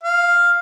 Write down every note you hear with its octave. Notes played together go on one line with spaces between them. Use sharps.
F5